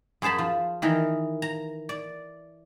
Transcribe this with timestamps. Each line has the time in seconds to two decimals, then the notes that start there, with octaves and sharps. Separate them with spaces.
0.22 F#2 G#4 C5 A5 B5
0.38 F3
0.82 D#3 E3 D#4 A#4
1.42 A#5
1.89 D5